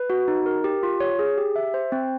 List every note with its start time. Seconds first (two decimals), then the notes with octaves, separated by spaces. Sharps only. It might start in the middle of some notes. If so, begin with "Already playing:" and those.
Already playing: B4
0.10 F#4
0.28 D#4
0.46 A#4
0.64 G4
0.83 F4
1.00 C#5
1.19 G#4
1.38 G4
1.56 E5
1.74 C5
1.92 C4